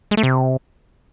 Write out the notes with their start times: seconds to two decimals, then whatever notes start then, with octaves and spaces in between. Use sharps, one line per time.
0.11 G#3
0.17 A3
0.23 C3